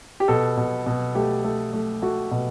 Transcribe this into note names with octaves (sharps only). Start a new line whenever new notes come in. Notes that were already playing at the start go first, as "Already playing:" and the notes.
G4
B2 A4
B2
B2
A3 G4
A3
A3
A3 F#4
B2